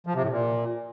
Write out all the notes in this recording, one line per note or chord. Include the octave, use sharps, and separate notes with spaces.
F3
C3
A2
A#2